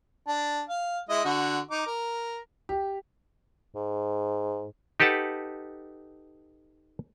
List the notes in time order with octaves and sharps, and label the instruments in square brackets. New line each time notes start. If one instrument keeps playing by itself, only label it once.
[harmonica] D4
F5
G#3 E4 D#5
D3 F#4
D#4 D6
A#4
[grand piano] G4
[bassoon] G#2
[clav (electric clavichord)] D#4 G4 A4 B4 F#5 A5